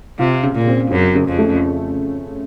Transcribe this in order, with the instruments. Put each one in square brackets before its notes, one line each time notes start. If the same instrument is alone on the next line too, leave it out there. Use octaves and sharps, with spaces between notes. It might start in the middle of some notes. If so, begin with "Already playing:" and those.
[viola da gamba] C3 [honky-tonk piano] F4
[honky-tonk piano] C#3
[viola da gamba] A#2
[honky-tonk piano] C4
[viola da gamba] F#2 [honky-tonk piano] C#4
[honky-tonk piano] C#3
[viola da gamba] F2
[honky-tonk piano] A3